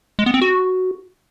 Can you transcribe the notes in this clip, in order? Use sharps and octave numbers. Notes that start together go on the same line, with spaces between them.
G#3
B3
C4
F#4